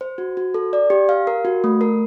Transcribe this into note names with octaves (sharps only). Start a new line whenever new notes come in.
C5
F#4
F#4
A4
D5
G4
F5
A#4
F#4
A3
A#4